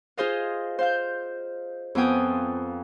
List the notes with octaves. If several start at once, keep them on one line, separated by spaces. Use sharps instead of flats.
F4 G#4 C5 D#5 F5
C5 F5 G6
F2 B3 F4 G5 G#5 D#6